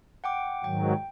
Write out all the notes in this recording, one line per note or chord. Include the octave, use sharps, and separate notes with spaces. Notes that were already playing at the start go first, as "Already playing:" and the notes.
F#5 G5 D6
G#2 D#3 F#3 G5